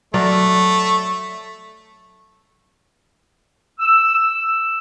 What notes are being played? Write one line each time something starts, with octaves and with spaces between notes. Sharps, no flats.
F#3 A3 A#4 D5
E6